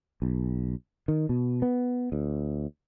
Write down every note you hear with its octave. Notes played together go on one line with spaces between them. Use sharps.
B1
D#3
B2
B3
D2